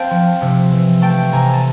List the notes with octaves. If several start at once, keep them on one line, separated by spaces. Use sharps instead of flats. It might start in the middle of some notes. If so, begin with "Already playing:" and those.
Already playing: C4 F5 G5 A5
F3
C3
E3
A3 G5 A5
C3 G#5 A#5
A5